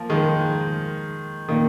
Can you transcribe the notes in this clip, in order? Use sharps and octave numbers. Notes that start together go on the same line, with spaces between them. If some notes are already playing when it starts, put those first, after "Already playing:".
Already playing: F3 A#3
D#3 G#3
A#2 D#3